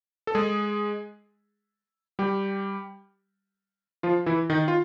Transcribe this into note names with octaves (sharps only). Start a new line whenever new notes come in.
A4
G#3 G#4
G3 G4
F3 F4
E3 E4
D#3 D#4
F4